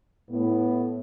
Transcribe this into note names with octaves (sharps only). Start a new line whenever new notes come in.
A2 B3